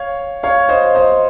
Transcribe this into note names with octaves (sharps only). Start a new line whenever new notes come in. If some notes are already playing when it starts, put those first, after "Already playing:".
Already playing: C#5 F5
C#5 F5
C5 D#5
C5 D#5